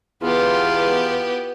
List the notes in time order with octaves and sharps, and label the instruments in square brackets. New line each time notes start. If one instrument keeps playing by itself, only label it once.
[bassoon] E2 [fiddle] B3 G4 [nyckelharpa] F4